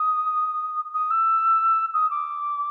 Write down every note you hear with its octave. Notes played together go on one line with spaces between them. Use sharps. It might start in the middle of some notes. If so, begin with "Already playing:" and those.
Already playing: D#6
D#6
E6
D#6
D6